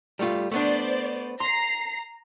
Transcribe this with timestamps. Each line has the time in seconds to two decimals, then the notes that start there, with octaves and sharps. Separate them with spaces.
0.19 G3 A3 F4
0.51 A3 B3 D4 C5 D5
1.40 A#5 C6 C7